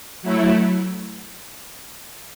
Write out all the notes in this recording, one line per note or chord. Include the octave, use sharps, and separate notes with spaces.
F#3 A3 E4